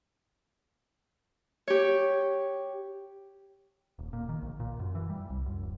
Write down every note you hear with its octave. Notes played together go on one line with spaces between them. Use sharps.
G4 C#5
D#1
A#2
D#3
A#1
A#2
F#2
E3
G3
C2
F#2
D1